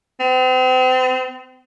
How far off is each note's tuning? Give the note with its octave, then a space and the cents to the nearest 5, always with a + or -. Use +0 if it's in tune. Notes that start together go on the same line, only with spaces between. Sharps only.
C4 -35